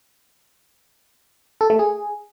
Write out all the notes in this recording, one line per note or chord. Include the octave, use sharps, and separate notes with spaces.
A4
A3
G#4